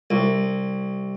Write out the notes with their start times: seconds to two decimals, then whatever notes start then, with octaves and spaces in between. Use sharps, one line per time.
0.10 C2